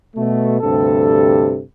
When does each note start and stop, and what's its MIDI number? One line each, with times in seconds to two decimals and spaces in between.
0.16 0.58 47
0.16 0.58 57
0.61 1.61 38
0.61 1.61 43
0.61 1.61 48
0.61 1.61 69